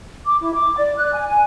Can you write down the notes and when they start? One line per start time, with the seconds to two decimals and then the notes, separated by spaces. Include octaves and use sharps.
0.25 D6
0.41 E4
0.54 D6
0.77 D5
0.97 F#6
1.14 G#5
1.27 G#5